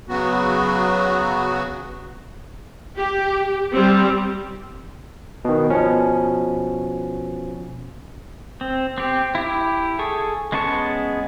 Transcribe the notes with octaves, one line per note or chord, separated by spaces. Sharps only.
C#3 F#3 B3 F#4
G4
G3 C4
B2 D#3
B2 F3 C#4
C4
C4 G4
E4 G4
G#4 A4 C#6
G#3 B3 C#4 A5 C#6